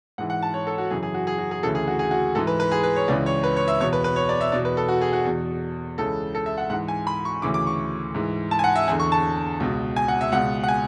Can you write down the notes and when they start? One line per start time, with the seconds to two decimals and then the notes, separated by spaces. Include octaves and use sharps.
0.18 G#2 E3 F#5
0.30 F#5
0.42 A5
0.54 C#5
0.67 A4
0.78 F#4
0.91 F#2 C#3 E3 G#4
1.03 G#4
1.14 F#4
1.27 G#4
1.38 F#4
1.51 G#4
1.63 D2 C#3 E3 A4
1.75 G#4
1.87 F#4
1.99 G#4
2.11 F#4
2.35 G#2 E3 A4
2.47 B4
2.60 B4
2.71 G#4
2.83 B4
2.96 C#5
3.08 C#2 C#3 E3 D5
3.26 C#5
3.43 B4
3.56 C#5
3.68 E5
3.80 E2 B2 C#5
3.93 B4
4.04 B4
4.16 C#5
4.29 D5
4.41 E5
4.52 E2 B2 D5
4.65 B4
4.77 A4
4.88 F#4
5.01 G#4
5.13 F#4
5.25 E2 B2
5.98 C#2 C#3 E3 A4
6.35 A4
6.46 E5
6.58 F#5
6.70 G#2 F#5
6.73 E3
6.88 G#5
7.07 B5
7.25 C#6
7.42 D2 C#3 E3 D6
7.54 D6
7.67 C#6
8.15 G#2 E3
8.51 A5
8.59 G#5
8.64 F#5
8.75 E5
8.88 E2 D3 G#5
9.00 C#6
9.12 A5
9.60 C#2 B2
9.96 G#5
10.08 F#5
10.21 E5
10.32 C#2 B2 F#5
10.63 F#5
10.68 G#5